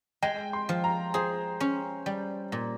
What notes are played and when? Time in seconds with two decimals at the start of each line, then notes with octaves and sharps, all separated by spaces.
0.22 G#3 G5
0.53 C6
0.69 F3
0.84 A#5
1.14 G#4 C5
1.60 C#4
2.06 G3
2.52 A#2